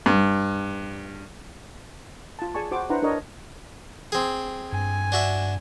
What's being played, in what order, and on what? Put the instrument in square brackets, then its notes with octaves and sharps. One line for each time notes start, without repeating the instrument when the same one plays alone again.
[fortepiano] G2
[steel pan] F4 A5
G#4 D5 G#5 A5 C#6
F#4 C5 D6
D4 E4 B4 C5 F#5 A#5
D4 A#4 C#5 D#5
[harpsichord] C4 G#4
[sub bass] G2 [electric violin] G#5
[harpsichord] D4 F#4 E5